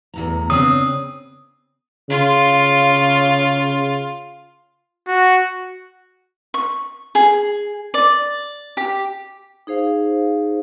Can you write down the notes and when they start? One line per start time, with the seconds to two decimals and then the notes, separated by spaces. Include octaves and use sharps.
0.14 E2 A2 A#5
0.50 C#3 C4 D4 D#6
2.10 C#3 F4
5.07 F#4
6.54 C#6
7.15 G#4
7.94 D5
8.77 G4
9.67 D#4 G#4 C5 F5